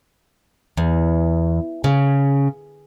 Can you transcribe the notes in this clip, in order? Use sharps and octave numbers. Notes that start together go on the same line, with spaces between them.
E2
C#3